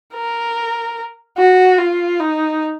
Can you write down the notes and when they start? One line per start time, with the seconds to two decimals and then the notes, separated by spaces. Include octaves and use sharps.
0.14 A#4
1.38 F#4
1.79 F4
2.20 D#4